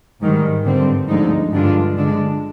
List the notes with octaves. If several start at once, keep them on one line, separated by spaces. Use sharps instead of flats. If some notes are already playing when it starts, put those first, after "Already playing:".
G#2 D#3 G3
G2 D3 G3 C4
D2 D3 F3 G#3 D#4
G2 D3 G#3 D4 F4
D3 G#3 D4